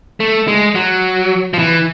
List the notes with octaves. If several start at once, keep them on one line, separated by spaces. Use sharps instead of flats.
A3
G#3
F#3
F3
E3